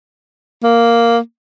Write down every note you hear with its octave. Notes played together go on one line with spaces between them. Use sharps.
A#3